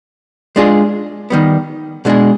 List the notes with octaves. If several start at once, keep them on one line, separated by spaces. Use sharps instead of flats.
G#3 D4 F4 G#4
D#3 G3 B3
B2 G#3 D4 G#4